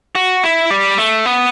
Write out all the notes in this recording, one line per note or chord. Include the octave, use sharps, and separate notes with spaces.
F#4
E4
G3
A3
B3